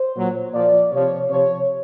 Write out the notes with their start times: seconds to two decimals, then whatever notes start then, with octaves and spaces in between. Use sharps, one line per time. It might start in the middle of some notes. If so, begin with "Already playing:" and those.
Already playing: C5
0.15 A#2 F#3
0.53 A#2 F3 D5
0.92 C3 F3 C#5
1.30 C3 F3 C#5